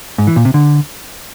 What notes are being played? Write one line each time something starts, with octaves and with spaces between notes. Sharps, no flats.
G#2
E3
A#2
C3
D3